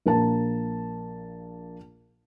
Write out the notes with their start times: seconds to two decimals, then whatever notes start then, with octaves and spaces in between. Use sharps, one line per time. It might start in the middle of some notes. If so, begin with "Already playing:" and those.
0.06 A#1 A#3 A#4 A5